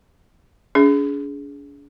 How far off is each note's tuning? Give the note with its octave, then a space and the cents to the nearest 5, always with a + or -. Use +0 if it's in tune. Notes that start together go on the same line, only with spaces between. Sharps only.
D4 -45 G#4 +10